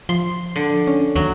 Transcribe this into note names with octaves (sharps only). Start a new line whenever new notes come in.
F3 C6
D3
C#4
D#2 F#3